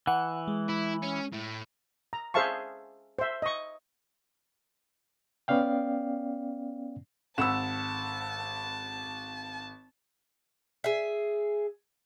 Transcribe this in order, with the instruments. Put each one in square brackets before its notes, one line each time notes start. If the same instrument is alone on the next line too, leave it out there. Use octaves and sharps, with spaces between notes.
[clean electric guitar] E3 [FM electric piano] F#5
[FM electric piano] G#3
[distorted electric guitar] E4
C#4
A2
[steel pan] A#5
G#4 C5 E5 F5 A5 C#6
C5 E5
D#5 C#6
[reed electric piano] B3 C#4 D5 F5 G5
[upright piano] G#1 E7 [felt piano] F#5 B5 E6 [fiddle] A5
[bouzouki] G#4 E5